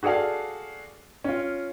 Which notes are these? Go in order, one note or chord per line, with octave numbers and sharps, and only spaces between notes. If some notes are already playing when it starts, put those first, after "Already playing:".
F#4 G#4 A4 D5 F5
C#4 F4